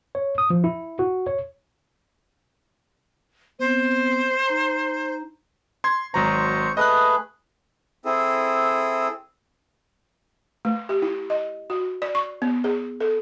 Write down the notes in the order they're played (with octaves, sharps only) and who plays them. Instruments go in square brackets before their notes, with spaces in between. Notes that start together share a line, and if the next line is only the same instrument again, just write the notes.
[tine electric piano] C#5
D#6
F3
E4
F#4
C#5
[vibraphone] B3 C4 [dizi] C5
[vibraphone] D#4 A#5
[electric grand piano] C6 G#6
[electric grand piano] G#1 F#3 A#5 [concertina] C5 C#6
[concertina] A3 G#4 B4 [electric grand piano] D#5 D#6 F#6
[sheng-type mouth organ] C4 E4 G#4 A4
[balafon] A3
G4
E4
D#5
F#4
D5
C#6
B3
G#4
A4